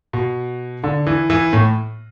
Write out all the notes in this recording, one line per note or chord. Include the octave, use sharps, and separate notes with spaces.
B2
D3
E3
E3
A2